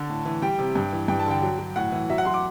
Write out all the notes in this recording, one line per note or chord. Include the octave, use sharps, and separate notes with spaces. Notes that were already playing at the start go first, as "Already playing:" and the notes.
Already playing: D3 A5
A2
E3
G3 G5
C3
G2
E3
G2 G5
A5
D3 G5
F#3
F#3
A2 F#5
E3
F#3 E5
F#5
F#3 C6
D6